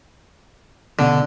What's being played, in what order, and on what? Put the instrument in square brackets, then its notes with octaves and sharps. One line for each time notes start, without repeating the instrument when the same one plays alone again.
[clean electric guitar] C#2 B2 [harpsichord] D3